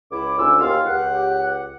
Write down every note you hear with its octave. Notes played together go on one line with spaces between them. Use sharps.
C#2 E4 D6
D2 G#2 C#4 F4 E6
D#2 F4 F5
C#2 G4 F#5